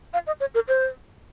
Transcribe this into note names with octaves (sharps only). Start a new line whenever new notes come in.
F5
D#5
C#5
A#4
C5